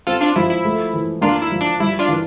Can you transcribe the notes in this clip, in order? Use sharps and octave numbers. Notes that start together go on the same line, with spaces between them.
C4 F4 A4
D4 F4
F3 E4
E4
A3
E3
A#3 D4 F4
E4
F3
D4
G3 E4
D4 F4
E3